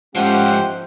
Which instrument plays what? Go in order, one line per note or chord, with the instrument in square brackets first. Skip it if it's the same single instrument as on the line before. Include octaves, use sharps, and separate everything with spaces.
[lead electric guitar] G#2 F3 [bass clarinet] G#3 [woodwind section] A3 C#4 F#5 [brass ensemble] G4 C5